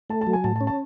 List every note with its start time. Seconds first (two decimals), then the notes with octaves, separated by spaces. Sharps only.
0.10 A3 A5
0.21 A5
0.27 F#3
0.33 G#5
0.44 A2 A5
0.56 A5
0.61 C#4
0.67 A5